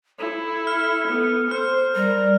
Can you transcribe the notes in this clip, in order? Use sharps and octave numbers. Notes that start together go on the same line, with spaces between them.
E4 A4
F6
B3
C5 F6
G3 A#4